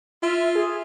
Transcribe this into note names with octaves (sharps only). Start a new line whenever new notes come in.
F4 E5
G#4